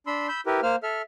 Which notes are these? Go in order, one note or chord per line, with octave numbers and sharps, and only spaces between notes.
D4 B5 C6 E6
B5 E6 G6
E4 G4 A#4 B4
A#3 C5 F6
A4 E5 F6